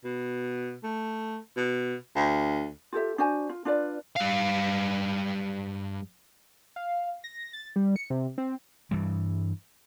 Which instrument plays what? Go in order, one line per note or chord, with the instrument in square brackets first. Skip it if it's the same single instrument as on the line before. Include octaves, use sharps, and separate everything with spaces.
[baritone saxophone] B2
A3
B2
D2
[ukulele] F4 G4 A4 E5
D4 F#4 C5 G#5
F4
D4 F4 B4 D5
[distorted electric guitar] G2 F5
[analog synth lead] F5
A#6
A6
G3
C#7
C3
C4
[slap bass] G2 E3 G3